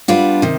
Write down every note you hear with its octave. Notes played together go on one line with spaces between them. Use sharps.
G3 B3 D4 F4
C3 D#3